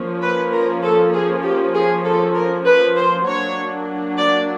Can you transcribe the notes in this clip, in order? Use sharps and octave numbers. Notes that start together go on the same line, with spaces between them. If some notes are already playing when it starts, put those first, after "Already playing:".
Already playing: F3 A#3 C#4
B4
A#4
A4
G#4
G4
G#4
A4
A#4
B4
C5
F#3 A#3 D4 C#5
D5